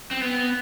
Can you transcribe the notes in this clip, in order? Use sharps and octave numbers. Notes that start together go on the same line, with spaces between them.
C4
B3